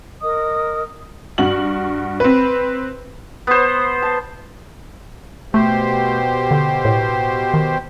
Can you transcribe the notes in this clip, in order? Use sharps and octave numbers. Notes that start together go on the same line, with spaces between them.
A#4 D#5 D#6
G2 F#4 F#7
C4 B4
B3 C5
A5
B2 A3 G4 C5
D3
A2
D#3